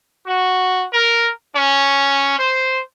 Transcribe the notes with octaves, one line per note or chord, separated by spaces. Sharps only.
F#4
A#4
C#4
C5